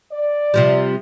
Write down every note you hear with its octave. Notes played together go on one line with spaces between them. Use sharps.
D5
C3 F3 G3